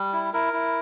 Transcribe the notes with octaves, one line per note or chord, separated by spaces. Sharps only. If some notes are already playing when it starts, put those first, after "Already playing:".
Already playing: G3
E4
E4 A#4
E4